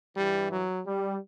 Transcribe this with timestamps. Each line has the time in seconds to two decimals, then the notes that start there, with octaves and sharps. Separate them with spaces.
0.15 G2 E3 G3
0.50 F#3
0.85 G3